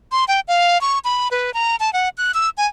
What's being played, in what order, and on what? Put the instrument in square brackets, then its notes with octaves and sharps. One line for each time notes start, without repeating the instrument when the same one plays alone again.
[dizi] C6
G5
F5
C#6
B5
B4
A#5
A5
F#5
F#6
E6
G#5